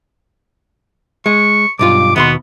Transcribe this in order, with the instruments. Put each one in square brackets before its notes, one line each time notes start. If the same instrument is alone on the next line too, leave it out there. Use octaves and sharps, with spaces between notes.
[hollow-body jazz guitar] G#3 [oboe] C#6
[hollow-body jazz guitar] B1 G2 F4 [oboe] D6
[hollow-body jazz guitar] D#2 B2 C6 [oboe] B3